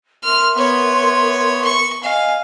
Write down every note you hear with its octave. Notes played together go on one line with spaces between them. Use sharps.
A#4 E5 C6 F6
B3 C#5
C#6
D#5 F5 G#5